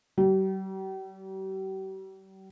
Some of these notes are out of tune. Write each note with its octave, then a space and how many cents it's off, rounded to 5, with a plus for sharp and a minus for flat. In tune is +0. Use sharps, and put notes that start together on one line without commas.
G3 -45